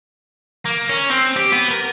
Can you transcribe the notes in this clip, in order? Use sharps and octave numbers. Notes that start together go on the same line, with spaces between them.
A#3
C#4
C4
G4
B3
A#4